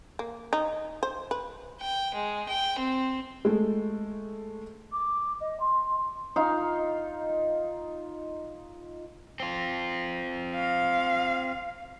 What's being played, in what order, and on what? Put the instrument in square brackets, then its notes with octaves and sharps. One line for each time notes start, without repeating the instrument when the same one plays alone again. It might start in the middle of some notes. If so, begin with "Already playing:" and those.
[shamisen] A#3
D#4
C5
B4
[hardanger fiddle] G5
G#3
G5
C4
[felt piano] G#3 A3
[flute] D6
D#5
C6
[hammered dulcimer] D#4 F4 F5
[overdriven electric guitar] C4 F4
[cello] F5